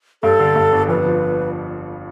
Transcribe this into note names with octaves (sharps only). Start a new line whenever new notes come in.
G2 A4
D3
G2
G1
F2 B4
F3